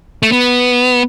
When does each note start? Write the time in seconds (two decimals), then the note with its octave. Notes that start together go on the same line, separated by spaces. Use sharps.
0.23 A3
0.32 B3